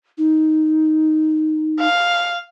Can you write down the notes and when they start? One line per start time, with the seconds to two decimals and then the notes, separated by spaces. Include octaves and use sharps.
0.18 D#4
1.80 F5